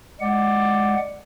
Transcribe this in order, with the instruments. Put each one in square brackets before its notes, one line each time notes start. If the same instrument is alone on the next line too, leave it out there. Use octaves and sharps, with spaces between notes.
[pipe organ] G#3 F#5 [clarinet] D5